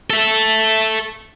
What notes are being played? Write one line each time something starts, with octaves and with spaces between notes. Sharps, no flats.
A4 E5